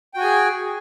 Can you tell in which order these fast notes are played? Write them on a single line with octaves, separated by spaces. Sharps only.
G5 F#4 G#5 G#4